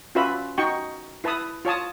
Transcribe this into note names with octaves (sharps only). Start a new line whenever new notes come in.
C#4 F4 F#4 B4 E5 B5
D#4 F#4 G5 C#6
E4 B4 A5 B5 D#6
F4 C#5 A5 D#6